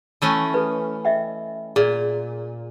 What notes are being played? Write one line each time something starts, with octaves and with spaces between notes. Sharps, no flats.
E3 A3 C#4
A4 B4
D#5 E5 G5
A#2 G#4 D5